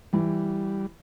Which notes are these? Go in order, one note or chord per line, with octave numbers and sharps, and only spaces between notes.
E3 G3